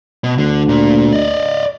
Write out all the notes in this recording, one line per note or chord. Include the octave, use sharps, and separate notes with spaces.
B2
D2 D3
A#2
D5 D#5